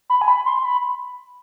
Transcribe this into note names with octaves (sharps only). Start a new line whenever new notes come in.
B5
G#5
B5
C6
B5